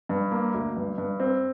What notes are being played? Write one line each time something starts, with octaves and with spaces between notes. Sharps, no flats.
G2
A#3
D2
G2
G2
C4